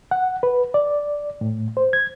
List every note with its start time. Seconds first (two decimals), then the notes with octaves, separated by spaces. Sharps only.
0.11 F#5
0.43 B4
0.74 D5
1.41 A2
1.77 C5
1.93 G#6